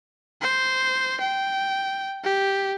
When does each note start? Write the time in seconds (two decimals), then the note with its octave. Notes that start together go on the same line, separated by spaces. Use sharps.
0.41 C5
1.20 G5
2.24 G4